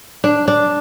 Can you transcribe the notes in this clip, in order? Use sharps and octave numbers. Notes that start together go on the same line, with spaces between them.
D4
D4